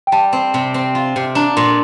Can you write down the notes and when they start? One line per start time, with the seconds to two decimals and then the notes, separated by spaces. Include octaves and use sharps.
0.07 G5
0.12 G3 A5
0.33 C4
0.54 C3
0.74 C4
0.95 F4
1.16 C3
1.35 D4 A#5
1.57 A#2 C6